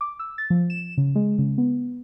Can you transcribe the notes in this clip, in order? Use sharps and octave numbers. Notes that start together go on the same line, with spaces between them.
D6
E6
A6
F3
E7
C#3
G#3
C#3
B3